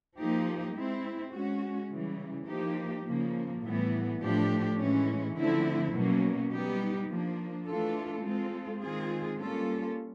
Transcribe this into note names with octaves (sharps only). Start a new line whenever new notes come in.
F3 A#3 D#4 G4
G#3 C4 E4
G#3 C#4 F#4
C#3 E3 G3
F3 A#3 D#4 G4
C#3 F3 A#3
A2 E3 G3 B3
A2 F3 A3 D4 G4
A2 E3 G#3 C#4
D3 F3 A3 C4 E4
B2 F#3 A#3 C#4
G3 B3 D#4 G4
F3 A#3 D4
E3 A3 D4 F4 A4
G#3 C4 F4 A4
D#3 G#3 C4 F4 G#4
G3 A#3 C#4 F4 A4